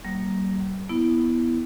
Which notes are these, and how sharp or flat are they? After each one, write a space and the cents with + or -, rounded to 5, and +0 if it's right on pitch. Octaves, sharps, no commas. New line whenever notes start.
G3 -45 A#3 +0
B3 +0 E4 +0